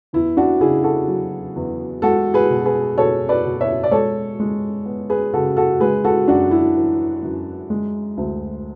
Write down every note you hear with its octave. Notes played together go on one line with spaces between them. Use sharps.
E2 E4
D4 F#4
C#3 E4 G#4
F#4 A4
F#3
E2
G#3 F#4 A4
G#4 B4
B2
G#4 B4
B2 A4 C#5
B4 D5
B2
C#5 E5
D5
G#3 A4 C#5
G#3
B3
G#4 B4
C#3 F#4 A4
F#4 A4
G#3 G#4 B4
F#4 A4
F#2 D4 F#4
E4
E3
F#2
G#3
D2